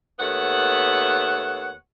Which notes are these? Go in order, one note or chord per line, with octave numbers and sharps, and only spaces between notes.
D#2 A3 B3 C#5 F#5